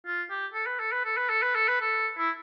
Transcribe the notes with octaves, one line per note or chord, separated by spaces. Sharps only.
F4
G4
A4
B4
A4
B4
A4
B4
A4
B4
A4
B4
A4
E4